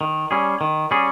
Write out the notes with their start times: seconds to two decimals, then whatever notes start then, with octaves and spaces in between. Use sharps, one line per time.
0.01 D#3
0.31 G3 C#4 G#4
0.61 D#3
0.91 G3 C#4 G#4